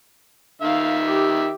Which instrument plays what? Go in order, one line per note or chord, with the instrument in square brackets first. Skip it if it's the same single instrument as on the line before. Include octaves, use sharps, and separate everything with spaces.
[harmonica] D#3 E5 [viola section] F5
[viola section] G4